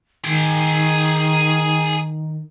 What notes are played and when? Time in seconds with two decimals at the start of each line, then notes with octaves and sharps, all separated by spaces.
0.25 D#3 G#4 G5